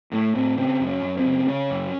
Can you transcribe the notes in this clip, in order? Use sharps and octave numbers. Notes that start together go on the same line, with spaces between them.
A2 A3
A2 C4
C#3 C4
F#2
C#4
F#2
C4
C#3
C#3 C#4
F#2